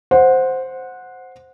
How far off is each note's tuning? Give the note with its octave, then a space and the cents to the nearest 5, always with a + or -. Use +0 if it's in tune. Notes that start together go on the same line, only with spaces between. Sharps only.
C5 +0 F#5 -15